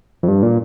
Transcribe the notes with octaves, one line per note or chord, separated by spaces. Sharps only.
F2
G2
A#2